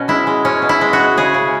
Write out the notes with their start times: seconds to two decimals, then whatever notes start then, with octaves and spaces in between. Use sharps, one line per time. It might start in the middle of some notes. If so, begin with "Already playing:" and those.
Already playing: B2 C#4
0.08 G#3 E4
0.27 G#3
0.45 B2 C#4
0.62 B2
0.69 E4
0.81 G#3
0.93 F#4
0.99 G#3
1.17 C#3 G#4
1.34 C#3